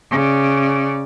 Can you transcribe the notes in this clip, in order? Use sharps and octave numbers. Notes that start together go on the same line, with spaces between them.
C#3 D5